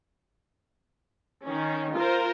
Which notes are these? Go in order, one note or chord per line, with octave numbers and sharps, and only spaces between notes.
D#3 C#4
F4 A#4 C5